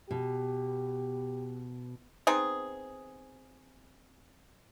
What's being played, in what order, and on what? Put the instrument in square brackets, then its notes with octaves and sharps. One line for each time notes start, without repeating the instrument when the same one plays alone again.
[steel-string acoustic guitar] B2 [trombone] G4
[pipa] B3 C4 D#4 G#4